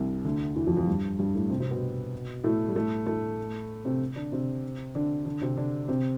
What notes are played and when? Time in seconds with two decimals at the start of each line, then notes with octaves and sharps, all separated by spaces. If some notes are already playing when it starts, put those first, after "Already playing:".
Already playing: C2 C3
0.24 D2 D3
0.56 E2 E3
0.66 F2 F3
0.77 F2 F3
0.87 G2 G3
1.19 G2 G3
1.35 A2 A3
1.50 C3 C4
1.60 C3 C4
1.71 B2 B3
2.44 A2 A3
2.69 G3
2.76 A2 A3
3.07 A2 A3
3.85 C3 C4
4.16 D3 D4
4.32 C3 C4
4.95 D3 D4
5.25 D3 D4
5.41 C3 C4
5.57 D3 D4
5.88 C3 C4